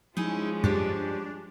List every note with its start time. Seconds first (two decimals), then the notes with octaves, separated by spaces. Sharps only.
0.17 F3 G#3 C#4 D#4 E4 G#4
0.64 G2 G3 D4 G4 C5